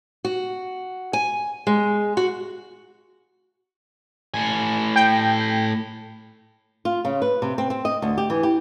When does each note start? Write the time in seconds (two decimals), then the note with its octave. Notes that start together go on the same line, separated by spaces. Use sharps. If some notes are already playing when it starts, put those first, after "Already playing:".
0.25 F#4
1.13 G#5
1.67 G#3
2.17 F#4
4.34 A2 G#5
4.96 G5
6.85 F4
7.05 C#3
7.22 B4
7.42 C3
7.58 C4
7.70 C4
7.85 D#5
8.02 D2
8.18 G4
8.30 E3
8.43 G4